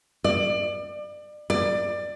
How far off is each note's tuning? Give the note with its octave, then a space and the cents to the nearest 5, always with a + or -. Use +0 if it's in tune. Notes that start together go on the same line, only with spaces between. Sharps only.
D5 +30
D5 +20